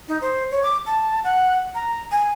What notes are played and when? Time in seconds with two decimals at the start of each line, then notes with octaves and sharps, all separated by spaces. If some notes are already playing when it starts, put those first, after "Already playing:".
0.08 D#4
0.21 C5
0.51 C#5
0.63 D6
0.86 A5
1.24 F#5
1.75 A#5
2.11 G#5